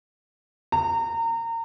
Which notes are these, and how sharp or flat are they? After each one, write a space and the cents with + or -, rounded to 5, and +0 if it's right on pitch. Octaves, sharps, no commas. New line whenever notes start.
A#5 -30